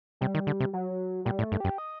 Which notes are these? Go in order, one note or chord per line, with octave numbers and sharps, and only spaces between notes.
C3 G3
D#3
D3
C3
F#3
A#2 G3
A2
A3
G2
F#2 G4
D#5